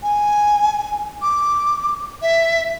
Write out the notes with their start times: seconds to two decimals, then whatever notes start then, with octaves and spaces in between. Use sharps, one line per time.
0.02 G#5
1.22 D6
2.22 E5